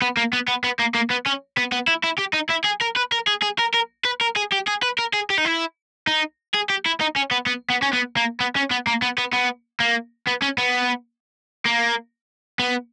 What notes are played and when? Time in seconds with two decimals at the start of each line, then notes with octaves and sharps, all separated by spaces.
0.02 B3
0.17 A#3
0.33 B3
0.48 B3
0.64 B3
0.79 A#3
0.94 A#3
1.10 B3
1.26 C#4
1.57 B3
1.72 B3
1.88 E4
2.04 E4
2.19 G4
2.34 D#4
2.50 E4
2.65 G#4
2.82 A#4
2.96 B4
3.12 A#4
3.27 G#4
3.43 G#4
3.59 A#4
3.74 A#4
4.05 B4
4.21 A#4
4.36 G#4
4.52 G4
4.67 G#4
4.83 B4
4.99 A#4
5.14 G#4
5.30 G4
5.38 D#4
5.45 E4
6.07 D#4
6.54 G#4
6.69 G4
6.85 E4
7.01 D#4
7.16 C#4
7.31 B3
7.46 B3
7.70 B3
7.83 C#4
7.93 B3
8.17 A#3
8.40 B3
8.56 C#4
8.71 B3
8.87 A#3
9.02 B3
9.18 B3
9.33 B3
9.80 A#3
10.27 B3
10.42 C#4
10.58 B3
11.66 A#3
12.59 B3